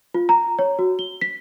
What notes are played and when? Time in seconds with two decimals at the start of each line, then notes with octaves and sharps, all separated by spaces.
0.14 F4
0.29 A#5
0.59 C#5
0.79 F#4
0.99 G7
1.21 B6